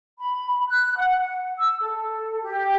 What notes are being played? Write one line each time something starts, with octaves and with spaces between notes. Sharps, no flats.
B5
F#6
F#5
E6
A4
G4